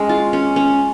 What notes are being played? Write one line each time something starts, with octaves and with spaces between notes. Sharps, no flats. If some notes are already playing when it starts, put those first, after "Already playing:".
Already playing: G#3 C#4
F4
C#4
C#4